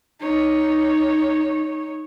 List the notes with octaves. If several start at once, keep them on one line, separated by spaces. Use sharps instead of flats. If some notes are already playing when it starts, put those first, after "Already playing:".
D#4 C#5